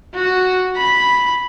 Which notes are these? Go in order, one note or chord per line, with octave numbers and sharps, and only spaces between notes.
F#4
B5